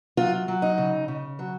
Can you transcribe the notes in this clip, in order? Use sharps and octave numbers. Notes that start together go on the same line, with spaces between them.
F#3 F4
F#3
D#4
C#3
C#3
F#3